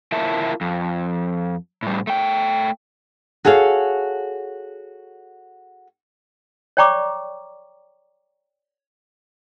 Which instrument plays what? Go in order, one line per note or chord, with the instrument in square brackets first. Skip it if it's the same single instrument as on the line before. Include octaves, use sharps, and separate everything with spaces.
[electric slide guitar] E4 F4 A#4 E5 A5
F2
A2 G3
A3 G5
[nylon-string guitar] F#4 G#4 A4 C#5 F5
[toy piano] C#5 D5 G5 A#5 C#6 D6